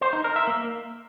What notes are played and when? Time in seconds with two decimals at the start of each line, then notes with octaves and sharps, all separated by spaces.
0.01 C5
0.13 D#4
0.24 A#4
0.36 E5
0.47 A#3